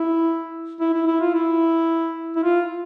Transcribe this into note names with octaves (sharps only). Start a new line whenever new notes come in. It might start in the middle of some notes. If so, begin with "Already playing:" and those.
Already playing: E4
E4
E4
E4
F4
E4
E4
F4